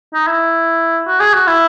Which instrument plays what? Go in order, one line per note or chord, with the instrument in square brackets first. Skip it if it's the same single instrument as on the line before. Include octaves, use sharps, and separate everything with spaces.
[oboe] D#4
E4
F#4
G#4
F#4
E4